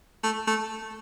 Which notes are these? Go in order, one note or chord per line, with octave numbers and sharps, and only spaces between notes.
A3
A3